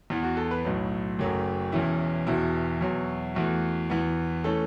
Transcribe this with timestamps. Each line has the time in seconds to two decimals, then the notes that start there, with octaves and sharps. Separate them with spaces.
0.10 E2 E3 B3
0.23 F#4
0.37 A4
0.51 B4
0.65 B1 A2 F#3
1.19 F#1 F#2 F#3 A3
1.72 E1 E2 E3 C#4 E4
2.27 E1 E2 B2 E4
2.81 E2 B2 F#3
3.35 E2 E3 A3 F#4
3.90 E2 E3 B3
4.44 E3 A3 C#4 A4